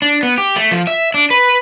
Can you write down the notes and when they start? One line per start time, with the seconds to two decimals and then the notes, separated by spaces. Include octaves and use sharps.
0.02 D4
0.23 B3
0.38 G4
0.56 A3
0.71 F3
0.87 E5
1.14 D4
1.30 B4